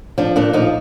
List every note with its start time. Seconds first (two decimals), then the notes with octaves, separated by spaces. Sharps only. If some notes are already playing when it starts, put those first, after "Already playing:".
0.18 F3 D4
0.36 A#2 D4
0.53 F3 D#4